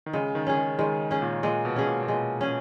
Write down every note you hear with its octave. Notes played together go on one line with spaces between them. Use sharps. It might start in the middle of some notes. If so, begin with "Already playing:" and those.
D#3
C#3 G#3
D#3
C#4 G#4
D#3
D#3 G#3
C#4 G#4
A#2
A#2 G#3
B2
C#4 G#4
A#2
A#2
B2 G#3
C#4 G#4